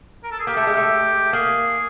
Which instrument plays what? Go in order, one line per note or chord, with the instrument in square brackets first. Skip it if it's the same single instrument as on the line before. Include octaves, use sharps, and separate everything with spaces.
[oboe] A#4
A4
G#4
[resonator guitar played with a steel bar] A#3 [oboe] G4
[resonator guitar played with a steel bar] A3
G#3
A3
[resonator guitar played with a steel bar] A#3 [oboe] G#4